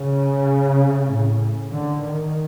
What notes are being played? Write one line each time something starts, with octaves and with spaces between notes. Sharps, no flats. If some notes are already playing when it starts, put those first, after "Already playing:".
Already playing: C#3
A2
D3
D#3